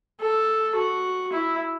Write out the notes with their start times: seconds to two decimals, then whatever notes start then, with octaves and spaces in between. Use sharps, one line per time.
0.20 A4
0.76 F#4
1.32 E4